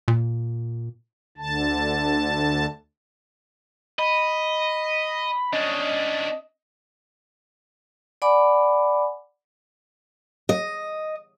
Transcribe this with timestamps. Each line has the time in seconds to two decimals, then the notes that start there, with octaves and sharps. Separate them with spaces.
0.08 A#2
1.38 D2 D3 A5
3.99 D#5 B5
5.53 C#4 D4 D#5
8.22 D5 F#5 G#5 B5 D6
10.49 D#5